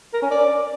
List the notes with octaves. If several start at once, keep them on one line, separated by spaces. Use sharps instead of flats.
A#4
C#4
D5